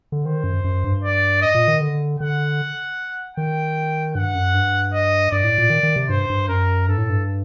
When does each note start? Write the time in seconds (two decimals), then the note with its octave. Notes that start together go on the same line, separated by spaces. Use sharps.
0.12 D3
0.25 D#3 C5
0.44 F#2
0.64 F#2
0.84 G2
1.03 D5
1.42 D#5
1.55 A#2
1.68 D#3
1.81 D3
2.19 D3 F#5
3.37 D#3 G5
4.14 G2 F#5
4.35 F#2
4.54 G2
4.93 D#5
5.31 G2 D5
5.44 A2
5.58 A#2
5.70 D#3
5.83 D#3
5.96 C3
6.09 G2 C5
6.30 G2
6.49 F#2 A#4
6.88 G2 A4
6.98 A2
7.10 G2